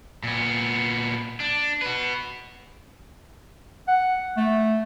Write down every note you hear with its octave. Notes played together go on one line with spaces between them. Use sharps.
A#2 B3
D4
F#4 B4
F#5
A3